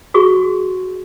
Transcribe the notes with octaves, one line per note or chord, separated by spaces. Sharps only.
F#4 G#4 C#6